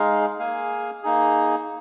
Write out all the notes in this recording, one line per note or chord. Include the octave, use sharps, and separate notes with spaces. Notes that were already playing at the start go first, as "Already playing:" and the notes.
Already playing: G#3 D#4 G#4 F5
A#3 G#4 F5 G#5
A#3 D#4 G#4